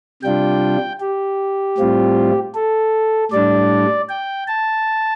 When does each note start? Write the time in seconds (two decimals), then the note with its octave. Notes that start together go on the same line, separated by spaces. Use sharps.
0.23 C3 G3 D4 F4 G5
1.00 G4
1.78 A2 G3 C4 F4
2.55 A4
3.32 A2 G3 D4 D5
4.09 G5
4.48 A5